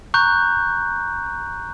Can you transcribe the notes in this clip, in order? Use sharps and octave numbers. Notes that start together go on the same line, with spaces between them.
A#5 C#6 F#6 G6